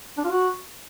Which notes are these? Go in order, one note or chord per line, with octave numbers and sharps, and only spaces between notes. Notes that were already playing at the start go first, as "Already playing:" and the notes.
D4
F4
F#4